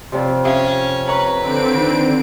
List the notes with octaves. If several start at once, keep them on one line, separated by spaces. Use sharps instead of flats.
F2 C3 C#5 D5
C#4 G4 E5 F5
B4 C#5 A#5 C#6
D3 C4 D7
D#3 D#4